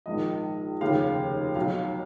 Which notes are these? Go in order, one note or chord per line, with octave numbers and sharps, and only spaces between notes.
A#1 G#2 D#3 D#5
F1 D#2 C#3 F5
B1 B2 F#3 F5